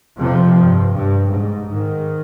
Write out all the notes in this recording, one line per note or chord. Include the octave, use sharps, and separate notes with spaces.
F2 C3 F3
G2
G2
G#2
G#2 D#3